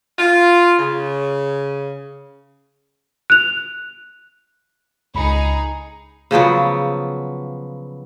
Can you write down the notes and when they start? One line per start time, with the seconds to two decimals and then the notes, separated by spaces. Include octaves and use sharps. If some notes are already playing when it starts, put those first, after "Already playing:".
0.18 F4
0.79 C#3
3.30 F#6 F7
5.15 C#2 D#4 G#4 B5 C#7
6.31 C#3 F3 F#3 B3